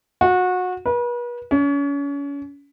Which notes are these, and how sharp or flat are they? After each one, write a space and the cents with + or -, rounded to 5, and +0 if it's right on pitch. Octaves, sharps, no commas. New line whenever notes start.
F#4 -25
B4 -40
C#4 +35